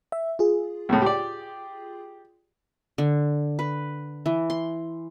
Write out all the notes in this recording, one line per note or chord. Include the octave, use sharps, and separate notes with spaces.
E5
F4 G#4
C#2 A2
G4 D5
D3
B4
E3
C6